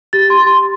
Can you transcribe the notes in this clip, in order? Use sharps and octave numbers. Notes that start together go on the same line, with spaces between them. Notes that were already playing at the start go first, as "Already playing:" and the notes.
G4 A6
C6
G4
C6